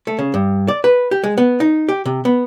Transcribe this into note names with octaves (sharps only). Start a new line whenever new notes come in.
A3
C#3
G2
D5
B4
G4
G#3
B3
D#4
G4
C3
B3